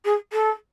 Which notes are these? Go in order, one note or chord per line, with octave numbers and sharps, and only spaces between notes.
G#4
A4